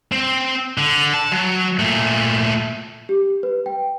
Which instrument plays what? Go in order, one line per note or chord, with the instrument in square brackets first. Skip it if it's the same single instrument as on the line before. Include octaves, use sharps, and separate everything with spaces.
[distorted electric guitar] C4
D3
A5
F#3
A#2 A3
[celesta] G4
B4
G5